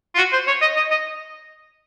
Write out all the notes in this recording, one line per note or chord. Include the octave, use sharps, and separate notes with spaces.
F4
F#4
C5
C#5
D#5
D#5
D#5